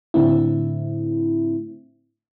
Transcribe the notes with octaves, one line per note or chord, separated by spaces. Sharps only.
A2 D3 A3 C4 E4